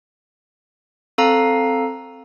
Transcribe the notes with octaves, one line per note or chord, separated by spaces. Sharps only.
C4 A4 F5 A#5